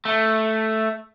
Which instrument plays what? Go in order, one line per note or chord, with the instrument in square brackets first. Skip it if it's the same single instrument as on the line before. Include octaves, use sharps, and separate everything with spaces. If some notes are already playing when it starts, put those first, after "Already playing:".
[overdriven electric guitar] A3